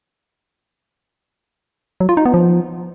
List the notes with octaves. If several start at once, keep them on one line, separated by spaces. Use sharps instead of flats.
F#3
F4
D#4
B3
F3